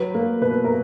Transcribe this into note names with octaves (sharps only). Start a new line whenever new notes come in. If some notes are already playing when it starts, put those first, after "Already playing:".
Already playing: F#3 B4
A#3
B2 B4
A#4